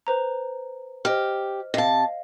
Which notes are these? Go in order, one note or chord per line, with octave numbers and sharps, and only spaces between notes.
B4 C5 A#5
G4 C5 D#5 F6
C3 D#5 F5 A5